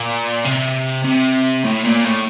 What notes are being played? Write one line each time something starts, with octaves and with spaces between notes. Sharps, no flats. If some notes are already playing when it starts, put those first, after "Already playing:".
Already playing: A#2
C3
C3
A2
A#2
A2